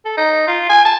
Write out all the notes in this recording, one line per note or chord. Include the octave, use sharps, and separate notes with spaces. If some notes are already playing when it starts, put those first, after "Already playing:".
A4
D#4
F4
G#5
A5